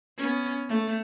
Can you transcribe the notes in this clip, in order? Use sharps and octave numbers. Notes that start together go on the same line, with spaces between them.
B3 C#4
A3